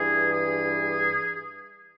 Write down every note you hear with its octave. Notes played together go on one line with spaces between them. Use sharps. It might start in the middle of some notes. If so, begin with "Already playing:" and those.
Already playing: G2 E3 G#4
G#4